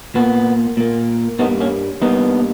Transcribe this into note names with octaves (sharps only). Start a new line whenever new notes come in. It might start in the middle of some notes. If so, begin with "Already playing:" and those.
A#2 A#3 B3
A#2 A#3
G2 G3 A#3 B3 D#4
A#3 C#4
G2 G3 A#3 B3 D#4